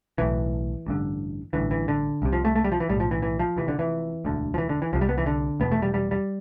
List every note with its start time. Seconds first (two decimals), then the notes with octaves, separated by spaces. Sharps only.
0.18 B1 A2 E3
0.87 A1 G2 D3
1.53 A1 G2 D3 E3
1.71 E3
1.88 D3
2.22 C2 C3
2.33 F3
2.45 A3
2.56 A3
2.64 G3
2.72 F3
2.80 E3
2.89 B1 A2 G3
3.00 F3
3.11 E3
3.23 E3
3.39 F3
3.56 F1 F2 C3 E3
3.68 D3
3.79 E3
4.25 E1 D2 D3
4.54 F3
4.58 E3
4.69 D3
4.82 E3
4.93 C2 C3 F3
5.01 G3
5.09 B3
5.18 E3
5.26 D3
5.60 F1 E2 B2 B3
5.72 A3
5.82 G3
5.94 G3
6.11 G3